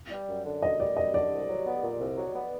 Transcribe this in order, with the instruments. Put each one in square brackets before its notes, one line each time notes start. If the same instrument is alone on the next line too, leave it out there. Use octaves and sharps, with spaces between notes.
[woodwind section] G3
F#2
D3
[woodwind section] F#2 [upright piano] D#5
[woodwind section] G3 [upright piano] D5
[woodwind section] F#2 [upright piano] D#5
[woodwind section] D3 [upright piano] D5
[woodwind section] C2
F#3
B3
A#2
C2
F#3
B3